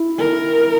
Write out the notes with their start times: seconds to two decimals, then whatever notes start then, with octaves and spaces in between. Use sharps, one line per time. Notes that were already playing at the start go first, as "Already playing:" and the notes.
Already playing: E4
0.19 A#4